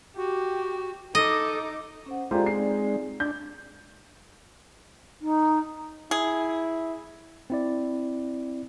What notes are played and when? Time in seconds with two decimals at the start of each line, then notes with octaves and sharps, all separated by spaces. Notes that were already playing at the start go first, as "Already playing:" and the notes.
0.17 F#4 G4
1.15 D#4 A4 D#5 D6
2.06 C#4 C5 F#5
2.31 G#3 F4 G4 A4 C5 D5 A#5
2.46 C4 D#4 D5 C7
3.20 D4 G6
5.21 D#4
6.11 E4 G#4
7.50 C4 E4 D5